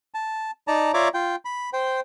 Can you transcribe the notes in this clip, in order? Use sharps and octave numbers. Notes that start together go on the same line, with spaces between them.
A5
D#4 D5 A5 A#5
F4 C#5 D5 E5 A#5 D6
F4 G5
B5
C5 G5